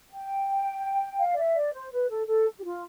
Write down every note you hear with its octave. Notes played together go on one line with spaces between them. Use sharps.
G5
F5
D5
E5
D5
C5
B4
A4
A4
G4
F4